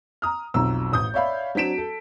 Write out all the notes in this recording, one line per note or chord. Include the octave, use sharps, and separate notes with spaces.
A#5 D#6 F6
B1 F2 A#5 E6
A1 D#6 G6
C#5 D5 E5 F5 B5
F#3 C4 D4 B6 D7 E7
A4